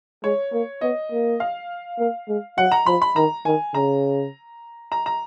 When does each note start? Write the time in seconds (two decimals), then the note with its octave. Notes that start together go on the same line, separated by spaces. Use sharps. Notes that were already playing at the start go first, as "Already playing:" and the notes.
0.24 G#3 C#5
0.53 A#3
0.81 B3 D#5
1.12 A#3
1.40 F5
1.99 A#3
2.28 G#3
2.58 F#3 F#5
2.71 A#5
2.86 F3 B5
3.02 B5
3.16 D#3 A#5
3.45 D#3 G#5
3.74 C#3 A#5
4.92 A#5
5.06 A#5